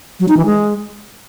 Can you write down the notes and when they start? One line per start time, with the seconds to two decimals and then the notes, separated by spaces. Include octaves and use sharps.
0.20 F#3
0.28 D#4
0.37 E3
0.46 G#3